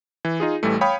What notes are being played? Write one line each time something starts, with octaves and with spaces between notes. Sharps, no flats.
E3
D#4 F4 G#4
A1 E3 G3 A3
C#5 F5 G5 B5 D#6